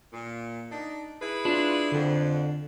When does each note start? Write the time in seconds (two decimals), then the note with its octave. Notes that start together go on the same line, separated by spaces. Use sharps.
0.12 A#2
0.71 D4 D#4
1.21 E4 G#4 B4
1.45 D4 F4
1.92 F2 D3